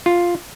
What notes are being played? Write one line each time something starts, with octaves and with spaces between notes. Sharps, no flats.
F4